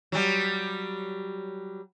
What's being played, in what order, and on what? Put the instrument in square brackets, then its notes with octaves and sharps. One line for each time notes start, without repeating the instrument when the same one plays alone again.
[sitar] F#3 G3